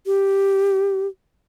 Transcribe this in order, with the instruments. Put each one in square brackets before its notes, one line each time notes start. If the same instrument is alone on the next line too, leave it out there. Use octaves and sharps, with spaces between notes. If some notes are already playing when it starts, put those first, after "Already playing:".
[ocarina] G4